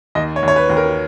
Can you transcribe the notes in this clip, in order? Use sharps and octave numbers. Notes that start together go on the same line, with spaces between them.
D#2 D#5
C#5
D#2
C#5
B4
D#2
A#4